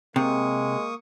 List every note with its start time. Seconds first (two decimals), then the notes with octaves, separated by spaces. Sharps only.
0.16 C3 G#3 A#3 C#6 D#6